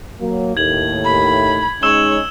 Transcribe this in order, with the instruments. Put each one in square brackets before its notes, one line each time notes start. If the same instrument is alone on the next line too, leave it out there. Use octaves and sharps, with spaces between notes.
[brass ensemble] F#3 A#3
[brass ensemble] D#2 A2 [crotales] G#6 F#7
[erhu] B5
[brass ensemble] G#3 C#4 D#4 [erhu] C#5 [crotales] E6 E7 G7